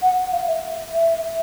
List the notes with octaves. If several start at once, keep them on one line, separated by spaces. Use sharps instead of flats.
F#5
F5
E5
E5